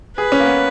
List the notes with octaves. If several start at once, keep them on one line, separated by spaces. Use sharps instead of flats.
G#4 B4
C#4
A#3
B3